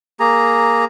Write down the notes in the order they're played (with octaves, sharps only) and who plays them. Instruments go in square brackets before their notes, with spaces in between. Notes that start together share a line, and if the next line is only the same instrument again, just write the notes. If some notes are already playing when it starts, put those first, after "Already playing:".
[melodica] A#3 G#4 A#5